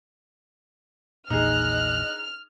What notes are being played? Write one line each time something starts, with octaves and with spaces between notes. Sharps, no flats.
A#1 E2 A#2 D#4 G#4 D#5 F6 F#6